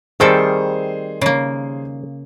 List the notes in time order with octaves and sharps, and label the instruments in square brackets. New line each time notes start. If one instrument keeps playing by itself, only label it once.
[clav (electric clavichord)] D#3 G3 [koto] A3 C4 A4 [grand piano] G#4 C5
[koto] C#3 A#3